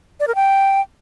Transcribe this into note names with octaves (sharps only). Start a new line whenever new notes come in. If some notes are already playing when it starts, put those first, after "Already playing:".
D5
A#4
G5